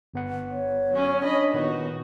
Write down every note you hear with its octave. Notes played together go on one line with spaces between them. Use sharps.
G1 B3 F#5
C#5
F#3 C#4
D4 D#5 B5
A#2 D#3 B3 D#4 F#4